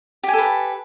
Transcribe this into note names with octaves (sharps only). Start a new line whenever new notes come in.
G4 A4 B4 G#5